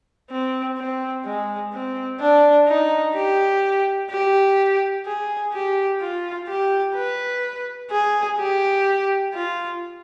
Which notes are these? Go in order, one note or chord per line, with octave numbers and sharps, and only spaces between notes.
C4
C4
G#3
C4
D4
D#4
G4
G4
G#4
G4
F4
G4
B4
G#4
G4
F4